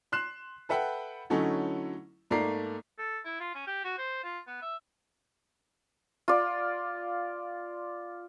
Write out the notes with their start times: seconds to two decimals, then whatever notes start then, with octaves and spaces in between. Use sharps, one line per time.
0.12 C6 F#6 C7 E7
0.69 A4 B4 E5 F#5 G5 B5
1.30 D3 F#3 A3 C#4 D#4 E4
2.31 G#2 A3 A#3 D5 A#5 C7
2.98 A4
3.25 E4
3.40 F4
3.55 C#4
3.67 G4
3.84 F#4
3.98 C5
4.24 F4
4.47 B3
4.62 E5
6.28 F4 D5